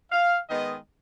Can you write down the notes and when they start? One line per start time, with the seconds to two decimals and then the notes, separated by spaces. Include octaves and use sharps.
0.12 F5
0.49 D#3 G#3 B3 D#5